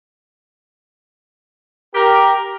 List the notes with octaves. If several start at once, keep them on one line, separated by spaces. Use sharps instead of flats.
G4 A#4